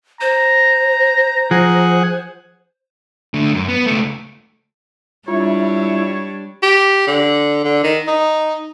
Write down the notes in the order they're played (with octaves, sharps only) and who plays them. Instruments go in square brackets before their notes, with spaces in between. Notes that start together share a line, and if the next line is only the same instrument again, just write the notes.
[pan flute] C5 [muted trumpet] A#5
[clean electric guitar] F3 [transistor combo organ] G#4 F#5
[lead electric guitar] D3 A3
F#2
B3
C#2 A3
[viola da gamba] G3 D4 [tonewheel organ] E4 [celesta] F4 [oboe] C#5
[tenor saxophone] G4
D3
D3
D#3
D#4